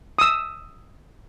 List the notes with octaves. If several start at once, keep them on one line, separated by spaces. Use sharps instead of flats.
D#6 E6